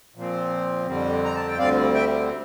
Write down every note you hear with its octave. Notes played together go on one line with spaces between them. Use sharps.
A#2 F3 C4
F2 D3 G3 C4
A#5
A5
G5
D2 D3 G3 C4 D5 F5
E5 G5